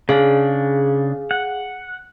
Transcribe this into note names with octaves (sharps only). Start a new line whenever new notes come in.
C#3 D4 G#4 F5
F#5